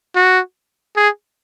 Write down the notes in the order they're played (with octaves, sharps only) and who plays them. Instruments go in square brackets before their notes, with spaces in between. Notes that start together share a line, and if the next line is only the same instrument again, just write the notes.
[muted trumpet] F#4
G#4